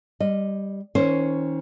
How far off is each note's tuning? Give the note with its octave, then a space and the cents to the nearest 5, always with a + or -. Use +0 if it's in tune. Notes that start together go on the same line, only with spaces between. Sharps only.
G3 +5 D#5 -10
D#3 +40 C#4 +0 C5 +0